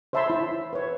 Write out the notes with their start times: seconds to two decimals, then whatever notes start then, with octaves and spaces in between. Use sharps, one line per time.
0.13 C5 C#5 E5 A5 B5 C6
0.30 E4
0.73 B4 C#5